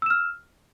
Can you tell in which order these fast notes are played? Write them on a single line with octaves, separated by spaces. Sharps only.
E6 E7 F6